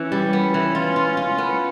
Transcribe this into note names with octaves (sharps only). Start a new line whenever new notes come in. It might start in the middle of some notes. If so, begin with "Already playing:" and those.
Already playing: E3 C#4
G3
B3
E3
F4
F4
F4
B3